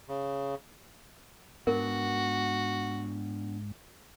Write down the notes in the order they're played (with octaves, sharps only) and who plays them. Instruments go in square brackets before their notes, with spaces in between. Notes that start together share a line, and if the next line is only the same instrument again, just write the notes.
[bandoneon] C#3
[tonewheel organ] G#2 [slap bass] B3 D4 [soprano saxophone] F#4 [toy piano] A#4